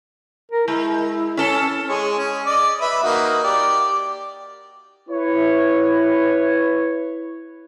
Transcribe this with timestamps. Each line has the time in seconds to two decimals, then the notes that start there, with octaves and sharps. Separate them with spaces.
0.51 A#4
0.68 G#3 E4
1.37 C#4 A4
1.89 G#3 G#4 C#5
2.18 C#4
2.46 D5 D#5
2.81 B4 E5
3.03 A#3 D#4 F#4
3.44 G4 D5
5.09 E4 B4 C#5